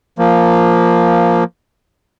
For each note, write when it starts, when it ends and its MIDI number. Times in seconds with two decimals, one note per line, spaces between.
0.19 1.44 53
0.19 1.44 58